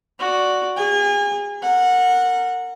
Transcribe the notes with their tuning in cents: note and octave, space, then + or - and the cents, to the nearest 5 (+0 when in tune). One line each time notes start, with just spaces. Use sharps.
F#4 +0 D5 +0
G#4 -35 G#5 -35
A#4 -25 F#5 -20